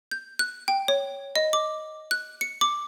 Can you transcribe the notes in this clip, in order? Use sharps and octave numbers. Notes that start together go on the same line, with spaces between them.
G6
F#6
G5
C#5
D#5
D6
F#6
C#7
D6